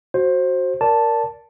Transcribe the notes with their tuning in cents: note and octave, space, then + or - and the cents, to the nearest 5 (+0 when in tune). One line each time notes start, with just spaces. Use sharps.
F#4 +0 C5 +15
A#4 +0 D5 -20 A5 +0